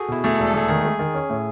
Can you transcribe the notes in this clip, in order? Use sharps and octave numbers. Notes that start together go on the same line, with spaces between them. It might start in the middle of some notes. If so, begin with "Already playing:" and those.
Already playing: F#4 G#4 A4
B2 E4
A3 G#4
A4
E1
A4
A3 G#4
D#3 G#4
G#3
D#3
C#4
A2